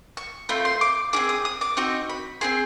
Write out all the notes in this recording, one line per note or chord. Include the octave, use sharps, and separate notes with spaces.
C#6
A3 C4 F4 B5
C6
D6
C4 E4 G#4 D6
D#6
D#6
D6
C4 D#4 F#4 C#6
B5
C4 E4 G#4 C6